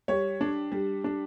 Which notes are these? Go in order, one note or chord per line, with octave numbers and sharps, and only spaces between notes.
G3 C#5
D4
G3
D4